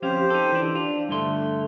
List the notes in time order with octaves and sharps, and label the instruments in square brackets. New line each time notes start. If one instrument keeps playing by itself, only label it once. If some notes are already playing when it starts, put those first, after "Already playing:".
[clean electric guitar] F2 C#4 F5 [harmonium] G4 C5
[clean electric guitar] D#4 A4
E3 D4
[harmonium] D4 [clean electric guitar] F4
[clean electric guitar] G2 D3 C6 [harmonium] A3